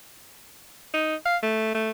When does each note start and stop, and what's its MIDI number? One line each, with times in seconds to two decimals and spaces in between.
0.94 1.15 63
1.26 1.37 77
1.43 1.71 57
1.75 1.91 57